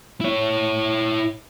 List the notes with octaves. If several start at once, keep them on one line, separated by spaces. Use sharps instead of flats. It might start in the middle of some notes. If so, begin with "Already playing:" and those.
E4 C#5